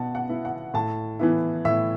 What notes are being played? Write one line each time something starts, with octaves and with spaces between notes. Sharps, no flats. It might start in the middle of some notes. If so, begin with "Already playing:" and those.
Already playing: B2 F#5 A5
F#5
B3 E4
F#5
A2 A5
E3 B3 E4
A2 E5